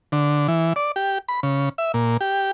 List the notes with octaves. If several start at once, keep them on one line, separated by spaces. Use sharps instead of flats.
D3
E3
D5
G4
B5
C#3
E5
A#2
G4